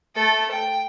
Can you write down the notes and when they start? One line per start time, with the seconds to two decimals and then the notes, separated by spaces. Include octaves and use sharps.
0.15 A3 A4
0.51 G5